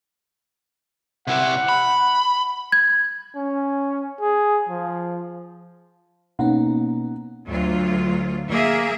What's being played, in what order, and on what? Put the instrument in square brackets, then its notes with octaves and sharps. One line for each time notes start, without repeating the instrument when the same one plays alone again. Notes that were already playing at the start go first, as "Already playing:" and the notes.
[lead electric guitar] C3 E4 [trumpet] F#5
[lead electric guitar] B5
[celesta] G#6
[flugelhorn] C#4
G#4
F3
[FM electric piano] B2 A#3 B3 [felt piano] C#4 D#4 F#5
[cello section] D2 F#3 F4
A#3 G#4 E5